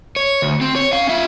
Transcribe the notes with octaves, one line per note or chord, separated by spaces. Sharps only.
C#5
D2
C4
C#5
C#4 F5
F4 E5